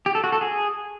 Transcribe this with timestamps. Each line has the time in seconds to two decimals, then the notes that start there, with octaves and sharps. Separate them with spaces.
0.06 G4
0.15 A4
0.24 F#4
0.32 A4
0.41 G#4